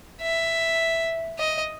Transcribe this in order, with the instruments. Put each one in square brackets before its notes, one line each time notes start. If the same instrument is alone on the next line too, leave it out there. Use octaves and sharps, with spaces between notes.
[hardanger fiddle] E5
D#5